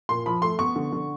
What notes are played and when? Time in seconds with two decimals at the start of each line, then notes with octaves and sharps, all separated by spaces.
0.09 A#2 C6
0.26 F3 B5
0.42 A3 C6
0.59 B3 C#6
0.76 D3
0.92 D3